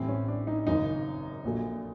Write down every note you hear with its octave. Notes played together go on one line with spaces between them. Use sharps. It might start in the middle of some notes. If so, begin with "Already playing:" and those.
Already playing: A1 A2 E3 G3 C4
C#4
D4
D#4
G#1 F#2 C#3 D#4
A#1 A#2 F#3 A3